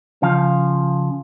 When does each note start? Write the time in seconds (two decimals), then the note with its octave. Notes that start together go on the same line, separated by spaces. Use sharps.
0.22 C#3 F3 F5